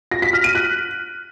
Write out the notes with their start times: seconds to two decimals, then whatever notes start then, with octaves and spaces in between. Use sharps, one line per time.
0.11 A#6
0.22 B6
0.33 F6
0.44 D#7
0.55 F#6